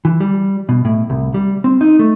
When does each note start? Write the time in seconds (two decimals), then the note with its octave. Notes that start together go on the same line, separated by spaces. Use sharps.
0.05 E3
0.20 G3
0.69 B2
0.85 A2
1.10 C2
1.34 G3
1.64 C4
1.81 D#4
1.99 A3